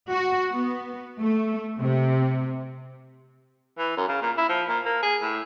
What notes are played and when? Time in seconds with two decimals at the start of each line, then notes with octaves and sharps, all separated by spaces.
0.11 F#4
0.51 B3
1.20 A3
1.80 C3
3.78 E3
3.97 F#2
4.08 C#3
4.22 A#2
4.37 E4
4.49 F3
4.68 A#2
4.85 A#3
5.03 G#4
5.22 A2